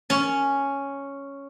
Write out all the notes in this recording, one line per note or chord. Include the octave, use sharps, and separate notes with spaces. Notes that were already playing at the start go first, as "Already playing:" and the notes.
C#4